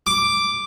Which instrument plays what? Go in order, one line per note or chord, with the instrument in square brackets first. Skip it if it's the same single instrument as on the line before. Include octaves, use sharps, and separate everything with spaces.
[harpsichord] D6